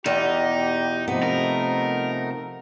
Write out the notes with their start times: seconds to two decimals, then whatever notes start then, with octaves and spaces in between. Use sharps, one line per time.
0.06 E2 B2 D#4 G4
1.08 C3 F3 A3 B3 D#4
1.23 A#4